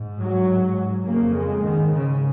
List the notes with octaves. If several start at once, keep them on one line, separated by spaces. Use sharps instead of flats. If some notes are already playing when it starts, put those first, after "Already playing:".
Already playing: G#2
F#3
G#2
F2 C#3 A#3
G#3
G#2 D#3
C#3